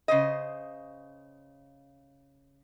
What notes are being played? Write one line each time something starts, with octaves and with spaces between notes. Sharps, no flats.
C#3 C5 D#5